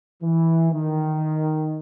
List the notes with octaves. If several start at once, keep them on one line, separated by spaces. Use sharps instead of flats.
E3
D#3